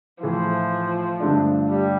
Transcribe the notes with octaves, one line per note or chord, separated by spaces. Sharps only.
A2 E3 F3 A3
G2 D3 A3 D4
G3